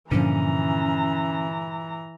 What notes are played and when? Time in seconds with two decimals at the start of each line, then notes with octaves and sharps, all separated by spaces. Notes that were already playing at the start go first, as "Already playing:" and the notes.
0.11 G2 A#2 D3 E3 F3 C#4 A#5